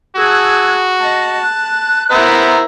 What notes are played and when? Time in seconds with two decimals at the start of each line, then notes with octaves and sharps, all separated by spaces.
0.17 F#4 G#4 A5 E6 F#6 G#6
1.01 D#5 A5
1.41 F#6
2.11 B3 E4 A#4 C5 E5 A#5